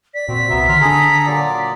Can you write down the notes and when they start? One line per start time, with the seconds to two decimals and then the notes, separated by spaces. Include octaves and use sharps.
0.14 D5 B6
0.28 A#2 C4 F#4
0.50 C2 C3 B3 E5 A#5
0.68 D3 D#3 F#3 C6 F6
0.81 D3 D4 G#4 A4 A#5 D#6
1.26 A#2 F#3 D5